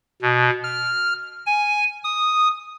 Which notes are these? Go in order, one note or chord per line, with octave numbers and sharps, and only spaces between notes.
B2
F6
G#5
D#6